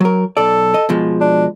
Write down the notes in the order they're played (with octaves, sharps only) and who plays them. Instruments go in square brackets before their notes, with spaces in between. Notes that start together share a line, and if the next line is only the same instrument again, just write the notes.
[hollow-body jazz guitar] F#3 A#4
[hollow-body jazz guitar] B1 D5 [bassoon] A4
[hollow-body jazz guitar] D#5
B2 F3 G#3
[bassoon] D4